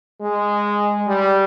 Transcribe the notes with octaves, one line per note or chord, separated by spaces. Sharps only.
G#3
G3